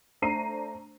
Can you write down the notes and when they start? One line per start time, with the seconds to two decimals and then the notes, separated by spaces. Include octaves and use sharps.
0.22 A3 D4 C5 A#5 C7 D#7